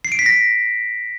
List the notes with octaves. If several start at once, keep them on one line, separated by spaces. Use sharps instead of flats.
C7
D7
B6
A#6